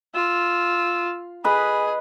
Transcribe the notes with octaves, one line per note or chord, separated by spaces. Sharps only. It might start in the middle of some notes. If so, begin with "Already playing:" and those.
F4 E6
G#4 B4 D#5 B5